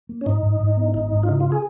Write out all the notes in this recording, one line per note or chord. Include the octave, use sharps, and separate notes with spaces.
A#3
C#4
G#2 D#4
G#2
G#2
B3
G#1 D#4
G#2
F4
C#3 D#4
F4
G#4